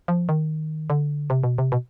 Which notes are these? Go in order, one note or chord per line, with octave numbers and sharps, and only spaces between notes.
F3
D#3
D3
C3
B2
C3
B2